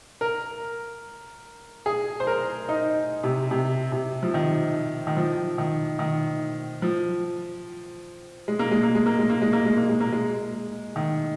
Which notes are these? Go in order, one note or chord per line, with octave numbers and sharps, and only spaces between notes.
A#4
G#4
C5
A#4
D#4
C3
C3
C3
F3
D#3
D#3
F3
D#3
D#3
F3
G#3
A#3
G#3
A#3
G#3
A#3
G#3
A#3
G#3
A#3
G#3
A#3
G#3
A#3
G#3
D#3